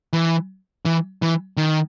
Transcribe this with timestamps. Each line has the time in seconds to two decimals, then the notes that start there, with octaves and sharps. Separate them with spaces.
0.14 E3
0.86 E3
1.22 E3
1.57 D#3